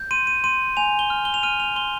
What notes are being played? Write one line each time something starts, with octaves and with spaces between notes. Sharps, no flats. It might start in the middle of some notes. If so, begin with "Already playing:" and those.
Already playing: G6
C6 D#7
D#7
C6 D#7
G#5 F7
G7
F6
G7
F7
F6 D#7
F7
C6 G7